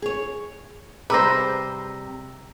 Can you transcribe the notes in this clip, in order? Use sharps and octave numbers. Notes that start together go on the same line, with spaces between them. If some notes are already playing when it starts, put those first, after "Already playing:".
G#4 C#5
C3 G3 G#4 B4 C5 A#5 E6 A#6